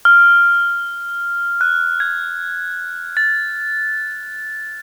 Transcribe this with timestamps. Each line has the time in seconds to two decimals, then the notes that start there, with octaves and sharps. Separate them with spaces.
0.05 F6
1.61 F#6
2.00 G#6
3.17 A6